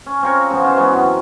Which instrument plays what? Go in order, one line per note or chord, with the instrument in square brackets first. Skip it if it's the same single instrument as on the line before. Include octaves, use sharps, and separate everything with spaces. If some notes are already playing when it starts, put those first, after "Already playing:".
[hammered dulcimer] C#4
C4 F4 A#4 C#5
C#3 F3 B3 C4
C#4 D#4 F#4 C5
E3 F#3 G#3 B3
F#2 C4